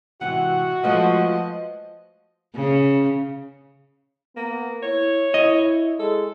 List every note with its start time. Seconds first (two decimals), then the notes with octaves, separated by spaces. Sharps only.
0.21 G#2 C3 E3 F#4 F#5
0.84 F3 G#3 A3 B4 D#5
2.56 C#3
4.36 A#3 B3
4.83 E4 C#5
5.34 E4 D#5
5.99 G#3 A4